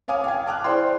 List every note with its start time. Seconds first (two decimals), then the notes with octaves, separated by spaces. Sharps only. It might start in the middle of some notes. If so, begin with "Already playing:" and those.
0.08 C#5 F5 G#5 D6 D#6
0.24 F5 G5 G#6
0.46 A5 D6 F6 F#6
0.64 E4 G#4 C5 D5 G5 C6